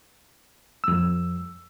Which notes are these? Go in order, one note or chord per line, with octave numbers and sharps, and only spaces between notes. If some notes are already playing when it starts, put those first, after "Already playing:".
F2 E6